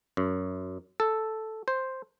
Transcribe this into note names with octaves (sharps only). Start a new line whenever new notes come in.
F#2
A4
C5